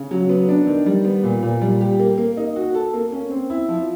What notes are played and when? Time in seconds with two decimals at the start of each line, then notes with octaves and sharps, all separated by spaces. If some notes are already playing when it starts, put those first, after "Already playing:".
Already playing: C#3
0.11 F#3
0.29 B3
0.49 D4
0.67 D#3
0.86 G3
1.05 B3
1.24 A#2
1.43 A#2
1.61 G3
1.81 G4
1.99 A#3
2.18 A#3
2.37 D#4
2.56 F#4
2.74 A4
2.93 A#3
3.12 C#4
3.31 C4
3.50 E4
3.69 F3